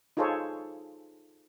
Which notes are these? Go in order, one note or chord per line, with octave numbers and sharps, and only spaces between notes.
D#4 F4 G#4 A4 C5 C#5